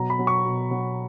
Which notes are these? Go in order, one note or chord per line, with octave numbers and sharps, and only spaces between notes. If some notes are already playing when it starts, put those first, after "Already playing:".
Already playing: B2 F#3 A#5
B5
F#3
C#6
B2
F#3